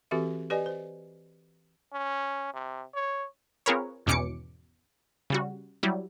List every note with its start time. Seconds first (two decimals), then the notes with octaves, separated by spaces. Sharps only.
0.11 E3 C4 F#4 G4 A4 E5
0.50 G4 B4 D5 D#5 G#5
0.66 C5
1.93 C#4
2.54 C3
2.94 C#5
3.66 C4 F4 G#4 A#4 B4 C#5
4.06 G#1 E2 B2 C#4 D6 C#7
5.30 C#3 G3 F#4
5.83 F#3 G3 E4